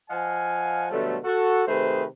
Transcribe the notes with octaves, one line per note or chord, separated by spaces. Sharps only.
F3 D#5 F5 F#5 G#5
B2 D3 F#3 G3 A3
F#4 A4
C3 D#3 A3 G#4 B4 C5